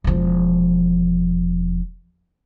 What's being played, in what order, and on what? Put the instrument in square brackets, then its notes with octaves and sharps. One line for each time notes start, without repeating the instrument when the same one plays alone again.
[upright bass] E1 F3